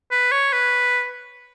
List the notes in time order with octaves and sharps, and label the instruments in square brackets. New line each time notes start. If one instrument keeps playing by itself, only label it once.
[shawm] B4
C#5
B4